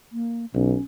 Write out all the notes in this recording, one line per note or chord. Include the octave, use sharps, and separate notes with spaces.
A#3
B1 C#4